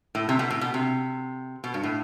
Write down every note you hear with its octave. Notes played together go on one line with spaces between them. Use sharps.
A2
C3
B2
A2
B2
C3
B2
G2
A2